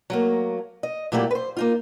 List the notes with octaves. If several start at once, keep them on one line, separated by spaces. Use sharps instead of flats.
F#3 A3 A#3
D#5
A#2 F#3 A3 A#3 E4 G4
B4 C5
A#3 D#4 F4